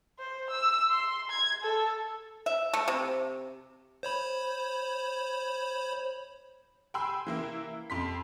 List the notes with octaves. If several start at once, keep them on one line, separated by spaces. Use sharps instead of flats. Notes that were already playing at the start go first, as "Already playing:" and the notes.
C5
E6
C6
G#6
A4
E5
A3
C3
C5 C#5 B5
G5 G#5 B5 C6 E6
E3 A#3 E4
F2 C6 B6